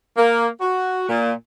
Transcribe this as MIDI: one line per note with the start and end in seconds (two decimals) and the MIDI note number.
0.17 0.46 58
0.60 1.03 66
1.08 1.32 46